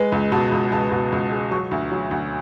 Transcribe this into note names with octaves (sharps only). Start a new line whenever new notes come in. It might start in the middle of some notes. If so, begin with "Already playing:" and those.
Already playing: G#3 B4
C#2
B2 A5
C#2
C#2 A5
B2
C#2
G#3
F#3 C#6
D2
F#3
D2